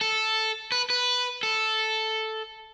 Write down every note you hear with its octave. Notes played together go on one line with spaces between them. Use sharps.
A4
B4
B4
A4